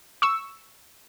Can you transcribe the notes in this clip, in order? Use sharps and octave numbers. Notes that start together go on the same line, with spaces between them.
C#6 E6